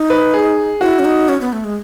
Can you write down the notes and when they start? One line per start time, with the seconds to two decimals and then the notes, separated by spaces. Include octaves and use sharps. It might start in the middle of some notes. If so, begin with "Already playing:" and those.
Already playing: D#4
0.10 B4
0.34 G#4
0.81 E4 F#4
0.99 C#4
1.05 D#4
1.29 C#4
1.41 B3
1.53 A3
1.64 G#3